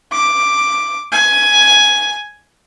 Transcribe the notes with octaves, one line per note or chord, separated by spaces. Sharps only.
D6
G#5